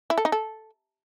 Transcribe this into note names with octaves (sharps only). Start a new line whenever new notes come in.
E4
A4
D#4
A4